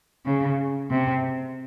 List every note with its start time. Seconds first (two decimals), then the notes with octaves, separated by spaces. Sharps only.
0.26 C#3
0.91 C3